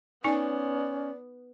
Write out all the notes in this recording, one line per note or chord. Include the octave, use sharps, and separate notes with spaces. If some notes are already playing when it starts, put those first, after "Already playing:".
B3 C#4 D#4 D5 G#5